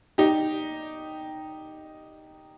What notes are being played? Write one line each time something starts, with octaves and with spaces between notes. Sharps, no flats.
D#4 G4